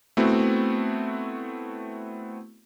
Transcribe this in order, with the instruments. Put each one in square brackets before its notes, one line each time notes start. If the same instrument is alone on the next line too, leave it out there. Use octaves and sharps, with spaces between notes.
[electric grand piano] A3 B3 C4 E4 F#4